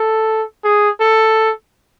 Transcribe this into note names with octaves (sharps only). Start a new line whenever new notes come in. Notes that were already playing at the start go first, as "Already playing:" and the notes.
Already playing: A4
G#4
A4